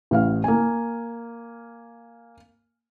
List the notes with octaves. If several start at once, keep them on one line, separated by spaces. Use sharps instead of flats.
A1 F5 F6
A#3 G#5